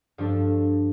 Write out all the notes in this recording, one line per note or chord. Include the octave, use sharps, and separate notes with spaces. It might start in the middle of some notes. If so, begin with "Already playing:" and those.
G2 F3 D4 A4